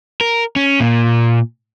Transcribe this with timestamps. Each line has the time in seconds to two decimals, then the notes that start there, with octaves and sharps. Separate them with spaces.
0.21 A#4
0.56 C#4
0.80 A#2